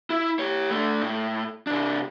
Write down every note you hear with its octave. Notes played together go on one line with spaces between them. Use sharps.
E4
G4 C#5
A3 D4
A2
C3 D4